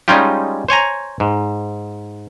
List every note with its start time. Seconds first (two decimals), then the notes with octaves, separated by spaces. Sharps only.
0.08 G3 G#3 C#4 D#4 F4 G4
0.68 C5 C#5 G#5 A#5
1.20 G#2